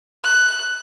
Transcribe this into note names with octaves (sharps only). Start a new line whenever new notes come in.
F#6